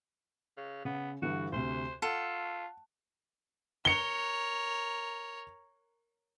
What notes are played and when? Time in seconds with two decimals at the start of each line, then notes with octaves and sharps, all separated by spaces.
0.57 C#3
0.85 C#3 B3
1.22 G2 D3 E3 F#4
1.52 D2 C3 C5
2.02 F4 A4 F#5
3.85 A#4 C#5 C#7 G7